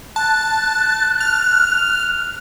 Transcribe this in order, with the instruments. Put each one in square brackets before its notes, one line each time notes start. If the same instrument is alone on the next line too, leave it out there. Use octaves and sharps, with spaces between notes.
[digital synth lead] A5 [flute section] F#6
[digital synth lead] F6